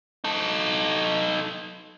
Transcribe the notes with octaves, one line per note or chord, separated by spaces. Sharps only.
D#4 A4